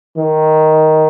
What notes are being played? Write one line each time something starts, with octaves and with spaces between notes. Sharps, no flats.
D#3